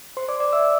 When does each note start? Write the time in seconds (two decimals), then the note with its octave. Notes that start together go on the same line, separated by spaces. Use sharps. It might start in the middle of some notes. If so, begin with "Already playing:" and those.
0.17 C5 C6
0.28 D5 D6
0.40 D5 D6
0.53 E5 E6